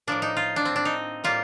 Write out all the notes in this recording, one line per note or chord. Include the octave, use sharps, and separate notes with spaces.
A2 F3 A#3 D4
D#4
F4
D4
C4
D4
D#4
A2 G3 A#3 F4